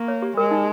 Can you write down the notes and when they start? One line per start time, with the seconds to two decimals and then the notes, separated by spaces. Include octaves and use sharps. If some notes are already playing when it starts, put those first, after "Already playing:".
Already playing: A#3 C#6
0.08 C#5
0.22 G4
0.37 G#3 A#4
0.51 D#4